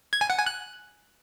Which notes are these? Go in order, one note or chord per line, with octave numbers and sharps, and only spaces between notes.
G#6
G#5
F#5
G#5
F#6